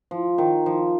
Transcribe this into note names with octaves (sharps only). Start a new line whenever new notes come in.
F3
D#3
F3